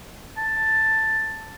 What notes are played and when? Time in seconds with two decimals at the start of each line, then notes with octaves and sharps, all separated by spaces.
0.37 A5